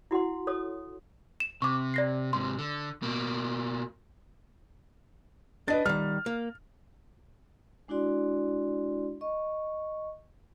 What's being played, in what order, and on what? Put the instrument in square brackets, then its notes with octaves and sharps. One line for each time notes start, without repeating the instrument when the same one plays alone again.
[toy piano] E4 F#4 F#5 C6
A4 C#5 D#6
[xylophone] E7
[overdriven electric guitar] C3 [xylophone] C#6 D6
[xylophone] D5 A#6 C7
[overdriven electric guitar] G#2 C3 [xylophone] C6
[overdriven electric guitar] D3
B2 A#3
[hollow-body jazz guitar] D4 [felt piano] B4 D#5 A6
[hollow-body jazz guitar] D#3 G3 [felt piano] F6
[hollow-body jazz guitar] A#3
[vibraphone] G#3 D4 E4 F#4 D5 C6
D#5 C#6